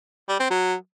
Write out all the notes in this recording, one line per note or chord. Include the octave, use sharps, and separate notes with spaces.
G3
C4
F#3